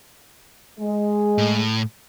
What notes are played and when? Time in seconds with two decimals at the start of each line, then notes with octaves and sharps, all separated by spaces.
0.80 G#3
1.38 A2